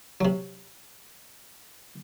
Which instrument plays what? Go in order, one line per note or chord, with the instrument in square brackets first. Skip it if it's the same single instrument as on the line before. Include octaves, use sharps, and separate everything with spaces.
[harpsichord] C3 F#3